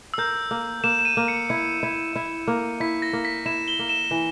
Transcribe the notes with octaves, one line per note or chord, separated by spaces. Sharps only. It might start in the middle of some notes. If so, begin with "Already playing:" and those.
E6
A#4 G6
A#3
A#3 E7
E7
D#7
A#3
C#7
E4 C#7
E4
E4
A#3
E4 B6
A#6
A#3
B6
E4 E7
G7
A#3
E7
E3